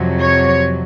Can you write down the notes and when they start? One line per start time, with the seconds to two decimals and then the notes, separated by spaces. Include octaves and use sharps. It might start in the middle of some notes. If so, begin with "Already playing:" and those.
Already playing: F2 C3 F#3
0.21 C#5